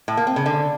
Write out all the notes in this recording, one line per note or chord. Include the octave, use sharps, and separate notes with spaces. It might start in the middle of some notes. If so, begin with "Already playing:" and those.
A2
A#3
C4
C#3
D3